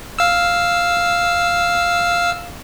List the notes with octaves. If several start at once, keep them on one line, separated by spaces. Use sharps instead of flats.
F5 E6